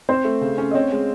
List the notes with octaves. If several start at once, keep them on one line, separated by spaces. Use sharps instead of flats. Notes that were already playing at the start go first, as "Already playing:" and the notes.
C4 C5
A3
C#3
C#4
D#5
C4 C#5
G#3